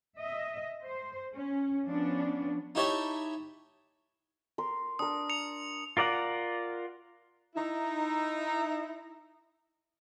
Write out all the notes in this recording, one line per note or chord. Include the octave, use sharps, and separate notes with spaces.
D#5 E5
C5
C#4
F3 B3 C#4 D4
D#4 E4 G4 C#5 E5 A5
A#4 C6
D4 A#4 D#6
C#7 F7
F4 A#4 D5 F#5
D#4 E4